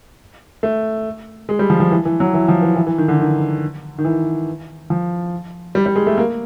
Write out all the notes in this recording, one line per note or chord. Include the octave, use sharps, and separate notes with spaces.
A3
G#3
G3
F3
F3
E3
E3
F#3
E3
F3
E3
E3
E3
D#3
D3
D#3
D#3
E3
F3
G3
G3
G#3
A3
A#3